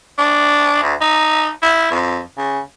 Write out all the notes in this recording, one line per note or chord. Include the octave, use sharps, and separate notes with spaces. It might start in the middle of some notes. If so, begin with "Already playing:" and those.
D4
D2
D#4
E4
F2
C#3